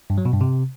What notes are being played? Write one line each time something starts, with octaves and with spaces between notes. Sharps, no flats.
G2
F#3
B2
G2
C3